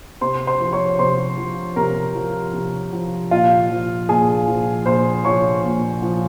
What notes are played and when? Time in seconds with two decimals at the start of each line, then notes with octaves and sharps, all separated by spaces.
0.21 C3 C5 C6
0.47 C5 C6
0.60 F3
0.73 C#5 C#6
0.99 C3 C5 C6
1.37 F3
1.76 C3 A#4 A#5
2.15 F3
2.53 C3
2.93 F3
3.31 A#2 F4 F5
3.70 F3
4.09 A#2 G#4 G#5
4.48 F3
4.86 A#2 C5 C6
5.25 F3 C#5 C#6
5.64 A#2
6.02 F3